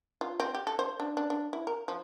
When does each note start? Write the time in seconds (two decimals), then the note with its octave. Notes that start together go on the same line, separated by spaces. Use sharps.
0.21 F4
0.40 C4
0.55 G4
0.67 A4
0.79 C5
1.00 D4
1.17 D4
1.30 D4
1.53 E4
1.67 A#4
1.88 F3